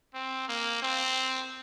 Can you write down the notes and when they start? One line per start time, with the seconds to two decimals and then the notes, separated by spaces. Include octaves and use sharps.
0.14 C4
0.48 A#3
0.82 C4